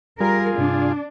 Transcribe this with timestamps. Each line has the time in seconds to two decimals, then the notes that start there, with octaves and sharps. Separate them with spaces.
0.20 G3 F4 G#4 A#4
0.58 G2 C3 D4